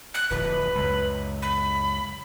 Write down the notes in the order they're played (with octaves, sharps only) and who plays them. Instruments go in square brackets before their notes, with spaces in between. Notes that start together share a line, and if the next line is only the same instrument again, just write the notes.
[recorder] F#6
[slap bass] D1 F2 [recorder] B4
[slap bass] C#2 F#2
[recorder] B5